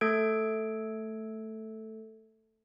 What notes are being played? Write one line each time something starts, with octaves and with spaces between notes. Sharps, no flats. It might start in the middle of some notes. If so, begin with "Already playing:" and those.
A3 A4 G#6 D7